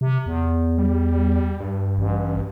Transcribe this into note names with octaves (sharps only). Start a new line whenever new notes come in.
C3
E2
G3
G2
A1